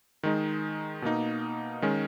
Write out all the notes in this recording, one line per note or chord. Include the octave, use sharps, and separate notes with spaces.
D#3 G#3 D#4
B2 A#3 D#4
D#3 G#3 C#4